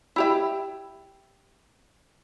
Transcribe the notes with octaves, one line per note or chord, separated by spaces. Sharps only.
E4 G4 E5